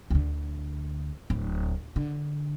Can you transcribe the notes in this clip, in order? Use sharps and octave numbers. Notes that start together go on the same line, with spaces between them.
D2 D3
D1
D3